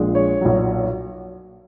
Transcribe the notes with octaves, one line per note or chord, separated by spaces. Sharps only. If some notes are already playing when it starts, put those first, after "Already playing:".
Already playing: A#1 A#2 G#3
C#5
B1 A#2 F#3